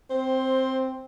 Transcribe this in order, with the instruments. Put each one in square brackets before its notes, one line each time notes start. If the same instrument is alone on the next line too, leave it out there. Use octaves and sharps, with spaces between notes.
[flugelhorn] C4 [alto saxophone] C5